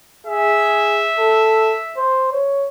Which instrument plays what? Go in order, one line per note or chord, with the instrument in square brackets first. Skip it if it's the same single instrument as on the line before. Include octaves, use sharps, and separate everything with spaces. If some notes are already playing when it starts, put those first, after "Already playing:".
[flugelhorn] G#4 [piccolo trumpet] E5
[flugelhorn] A4
C5
C#5